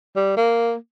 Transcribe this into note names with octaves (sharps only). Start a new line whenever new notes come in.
G3
A#3